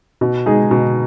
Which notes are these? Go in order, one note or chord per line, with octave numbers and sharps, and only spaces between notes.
B2
G#3 D#4 G#4
B2